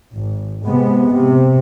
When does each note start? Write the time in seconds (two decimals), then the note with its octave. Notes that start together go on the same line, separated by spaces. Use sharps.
0.15 G#1
0.65 C3 G#3 B3
1.14 C3